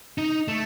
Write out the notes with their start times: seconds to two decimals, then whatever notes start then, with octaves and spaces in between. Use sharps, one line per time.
0.18 D#4
0.48 A3